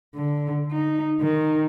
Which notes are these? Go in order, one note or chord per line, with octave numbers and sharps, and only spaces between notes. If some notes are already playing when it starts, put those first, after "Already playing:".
D3
D#4
D#3